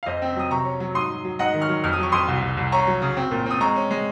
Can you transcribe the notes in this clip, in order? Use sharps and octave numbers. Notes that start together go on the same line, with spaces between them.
F5
F2 C5 D#5
C4
F#3 D#6
C3 A#5 C#6
C#4
F#3
G#2 C6 D#6
F#3
F#3
G#2 D#5 F#5
D#3
C#6 F6
F#3
F2 F6
D#6
F#3 C#6
F2 C6 D#6
C2
C2
C2
C#4 A#5 C#6
F#3
C#3
C4
A#2
C4 D#6
G#3 A#5 C#6
C#4
G#3